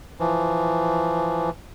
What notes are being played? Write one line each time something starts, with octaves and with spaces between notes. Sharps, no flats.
E3 F3